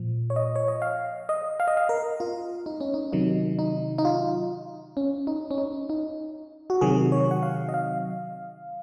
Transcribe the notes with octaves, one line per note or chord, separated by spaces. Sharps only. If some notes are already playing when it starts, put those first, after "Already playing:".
Already playing: A#2 F3
C#5
D#5
C#5
D#5
F5
D#5
F5
D#5
F5
A#4
F4
D#4
C#4
D#4
C3 D#3 F#3 D#4
D#4
D#4
F4
C#4
D#4
C#4
D#4
D#4
F#4
C3 D#3 F#3 G#4
C#5
F#5
F5
D#5
F5